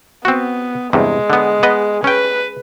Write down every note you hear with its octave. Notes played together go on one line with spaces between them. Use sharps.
B3 C4 F#4
E2 G2 C3 G#3
D3 B3
B3 B4 D#5
C#4 B4 G5